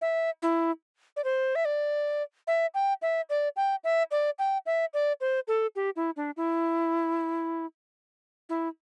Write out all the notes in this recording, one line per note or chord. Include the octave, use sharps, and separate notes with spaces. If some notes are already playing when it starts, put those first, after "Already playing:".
E5
E4
D5
C5
E5
D5
E5
G5
E5
D5
G5
E5
D5
G5
E5
D5
C5
A4
G4
E4
D4
E4
E4